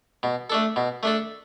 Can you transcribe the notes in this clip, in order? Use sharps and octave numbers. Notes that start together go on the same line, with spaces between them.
B2
A3 D4 A4
B2
A3 D4 A4